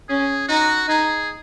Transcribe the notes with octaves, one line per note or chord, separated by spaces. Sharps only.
C#4 G#4
D#4 F#4
D#4 G#4